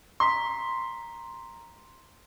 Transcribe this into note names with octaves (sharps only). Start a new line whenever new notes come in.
A#5 C6 B6